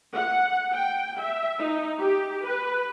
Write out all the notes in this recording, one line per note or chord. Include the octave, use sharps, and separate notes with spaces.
F#5
G5
E5
D#4
G4
B4